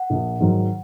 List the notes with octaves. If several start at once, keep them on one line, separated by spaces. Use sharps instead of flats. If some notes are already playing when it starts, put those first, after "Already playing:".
Already playing: F#5
A#1
G#2 D#3 F#3